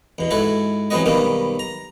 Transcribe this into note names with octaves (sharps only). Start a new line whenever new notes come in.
E2 B2
G#2 E4 F#4 A4
C3 E3 F#3 B3 F#4 D#5
B1 D#3 G3 A#3 B3
A#5